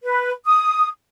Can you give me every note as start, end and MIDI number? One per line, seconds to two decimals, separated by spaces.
0.03 0.31 71
0.45 0.88 87